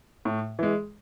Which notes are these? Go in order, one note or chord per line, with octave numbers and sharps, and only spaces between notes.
A2
E3 G#3